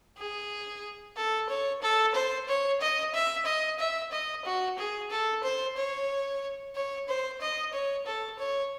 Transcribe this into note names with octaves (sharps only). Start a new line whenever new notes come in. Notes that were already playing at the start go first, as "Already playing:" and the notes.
G#4
A4
C#5
A4
C5
C#5
D#5
E5
D#5
E5
D#5
F#4
G#4
A4
C5
C#5
C#5
C5
D#5
C#5
A4
C#5